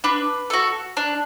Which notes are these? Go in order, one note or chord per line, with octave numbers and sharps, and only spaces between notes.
D4 B4
F#4 A4
D4